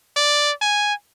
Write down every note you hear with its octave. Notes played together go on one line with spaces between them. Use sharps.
D5
G#5